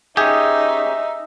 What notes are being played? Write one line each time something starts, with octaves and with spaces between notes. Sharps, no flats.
C#4 D#4 G4 G#4 E5